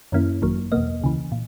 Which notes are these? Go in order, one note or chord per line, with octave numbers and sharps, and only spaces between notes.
F#2 D#3 A#3 C#4 E4
G#1 F#2 D#3 F#3 A#3
E2 B2 A#3 D#5
C#2 C#3 E3
A#2